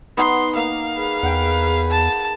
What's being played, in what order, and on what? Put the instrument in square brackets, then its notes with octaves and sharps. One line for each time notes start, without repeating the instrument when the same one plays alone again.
[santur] B3 D#4 [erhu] C6
[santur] A#3 [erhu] F5
[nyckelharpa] G#4 B4
[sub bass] E2 [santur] F#5 G5
[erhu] A5